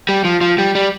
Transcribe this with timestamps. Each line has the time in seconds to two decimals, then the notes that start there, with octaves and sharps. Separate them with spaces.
0.09 G3
0.24 F3
0.41 F3
0.58 G3
0.75 G3